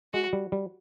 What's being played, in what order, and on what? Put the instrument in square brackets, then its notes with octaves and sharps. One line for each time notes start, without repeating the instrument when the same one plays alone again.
[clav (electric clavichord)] G#3 [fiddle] F#4
[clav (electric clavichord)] G3
G3